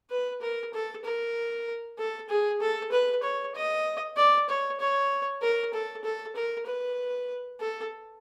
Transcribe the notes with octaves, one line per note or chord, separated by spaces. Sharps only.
B4
A#4
A4
A#4
A4
G#4
A4
B4
C#5
D#5
D5
C#5
C#5
A#4
A4
A4
A#4
B4
A4